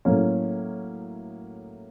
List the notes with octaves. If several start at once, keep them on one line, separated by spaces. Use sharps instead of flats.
A2 F#3 A#3 C#4